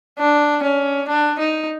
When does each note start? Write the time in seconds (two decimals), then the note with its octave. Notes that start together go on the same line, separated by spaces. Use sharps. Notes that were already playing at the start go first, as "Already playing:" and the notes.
0.19 D4
0.63 C#4
1.08 D4
1.39 D#4